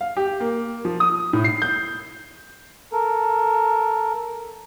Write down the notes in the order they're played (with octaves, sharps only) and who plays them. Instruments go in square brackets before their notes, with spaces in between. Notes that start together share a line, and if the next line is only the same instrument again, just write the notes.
[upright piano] F5
G4
A#3
F3
D#6
A2
C7
G6
[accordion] A4 A#4